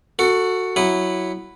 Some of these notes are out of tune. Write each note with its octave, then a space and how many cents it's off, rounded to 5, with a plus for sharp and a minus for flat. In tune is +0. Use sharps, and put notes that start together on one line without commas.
F#4 -5 A4 +25
F#3 +0 E4 +0 D#6 -25